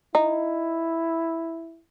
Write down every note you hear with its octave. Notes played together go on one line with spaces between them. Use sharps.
D#4 E4